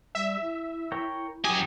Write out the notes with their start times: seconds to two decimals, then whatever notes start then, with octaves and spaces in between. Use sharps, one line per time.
0.15 G3 E5
0.41 E4
0.92 A#4 C#5 G5
1.44 F#2 G4 G#5 D#6